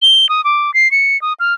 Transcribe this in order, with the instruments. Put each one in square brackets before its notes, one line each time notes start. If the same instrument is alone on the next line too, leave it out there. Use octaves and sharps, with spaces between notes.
[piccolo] G7
D#6
D6
C7
C#7
D#6
F6